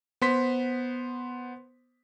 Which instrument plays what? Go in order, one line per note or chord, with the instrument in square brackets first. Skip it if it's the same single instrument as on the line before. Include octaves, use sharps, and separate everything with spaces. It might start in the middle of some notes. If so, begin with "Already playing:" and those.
[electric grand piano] B3 C5 C6 B6